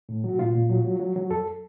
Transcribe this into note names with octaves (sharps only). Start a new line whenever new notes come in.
A2
F#3 F#4
A#2 F4
A#2
F#3
F#3
F#3
F#3
F2 A4